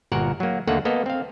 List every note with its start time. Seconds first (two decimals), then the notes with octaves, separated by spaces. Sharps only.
0.12 G1 A#2 F#4 A#4 F#5
0.40 F#3 A#3
0.67 D#2 D3 A3 A#3 A4 F#5
0.85 A#3 B3 A4 D#5
1.06 C4 F5